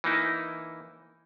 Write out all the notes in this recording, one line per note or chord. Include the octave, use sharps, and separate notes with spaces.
E3 A#3 D#4 E4